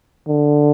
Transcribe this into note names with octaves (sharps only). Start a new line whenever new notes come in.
D3